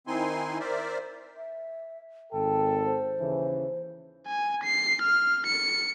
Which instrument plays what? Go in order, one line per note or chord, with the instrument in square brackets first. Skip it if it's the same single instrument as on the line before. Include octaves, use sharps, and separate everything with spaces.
[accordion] D#3 C4 D#4 E4 G#5 C6
A#4 C5 D5 E5
[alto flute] E5
[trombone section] G#1 A4 [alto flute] G5
[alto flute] C5
[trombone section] D#2 C#3 E3
[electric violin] G#5
C7
F6
C#7